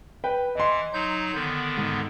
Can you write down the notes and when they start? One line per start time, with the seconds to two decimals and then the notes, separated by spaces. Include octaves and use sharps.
0.24 B4 G5
0.55 E3 D#5 C6
0.93 F#3 D#4 G6
1.34 D3 D#3 B3
1.77 G#2